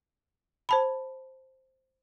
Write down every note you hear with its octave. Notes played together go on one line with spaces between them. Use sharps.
C5 A5 B5